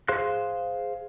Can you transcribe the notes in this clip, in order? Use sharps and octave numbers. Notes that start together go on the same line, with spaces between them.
G#4 C5 F5 C6 F#6